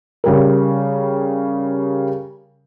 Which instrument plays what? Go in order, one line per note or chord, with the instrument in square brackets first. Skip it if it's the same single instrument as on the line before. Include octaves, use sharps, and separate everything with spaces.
[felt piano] C#3 G3 A#4